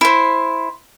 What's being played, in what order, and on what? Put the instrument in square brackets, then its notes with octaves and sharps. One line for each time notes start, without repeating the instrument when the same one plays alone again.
[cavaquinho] E4 C5